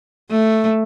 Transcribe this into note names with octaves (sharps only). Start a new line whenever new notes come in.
A3